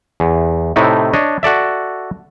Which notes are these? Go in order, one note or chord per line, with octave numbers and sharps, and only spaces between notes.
E2
A2 C3 A3 D#4 E4
D4 C#5 D#5
F#4 A4 D5 E5